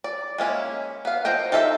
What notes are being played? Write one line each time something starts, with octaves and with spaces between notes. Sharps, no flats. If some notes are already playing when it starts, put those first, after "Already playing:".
D5
G#3 A#3 C#4 E4
B3 F5
F3 A#4 D#5 G5
D#4 F4 A4 B4 E5